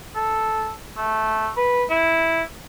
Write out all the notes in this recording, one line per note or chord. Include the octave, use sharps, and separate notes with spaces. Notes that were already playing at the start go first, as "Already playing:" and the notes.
A4
A3
B4
E4